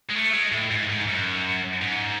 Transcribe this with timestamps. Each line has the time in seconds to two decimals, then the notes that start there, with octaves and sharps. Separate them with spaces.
0.10 G#3
0.16 A3
0.34 G#3
0.52 A2
0.71 G#2
0.89 G#2
1.08 F#2
1.81 G#2